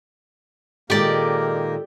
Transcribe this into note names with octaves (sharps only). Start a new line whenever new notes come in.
A#2 D#3 G#3 A#3 G4 A4 A#4 D5